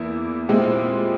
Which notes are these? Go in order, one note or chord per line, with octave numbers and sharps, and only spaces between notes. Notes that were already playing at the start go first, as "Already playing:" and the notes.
Already playing: E2 E3 A#3 E4
A#2 G#3 C4 E4 G4